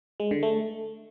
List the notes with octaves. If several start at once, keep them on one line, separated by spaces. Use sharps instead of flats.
G#3
D3
A3